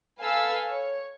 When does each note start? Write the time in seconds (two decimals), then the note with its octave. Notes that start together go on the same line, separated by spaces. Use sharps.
0.21 A4 B4 F5 G#5 E6
0.68 C#5